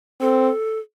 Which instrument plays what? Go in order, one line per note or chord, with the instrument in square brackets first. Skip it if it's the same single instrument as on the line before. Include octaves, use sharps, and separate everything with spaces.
[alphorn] C4 [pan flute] A4